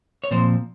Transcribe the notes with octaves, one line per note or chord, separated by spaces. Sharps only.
C#5
A#2 F3 C4 C5